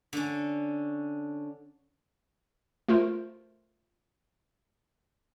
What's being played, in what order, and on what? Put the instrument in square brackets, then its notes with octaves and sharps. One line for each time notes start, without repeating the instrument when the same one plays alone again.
[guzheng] D3 C#4
[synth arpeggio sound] A3 F4 A#4 C5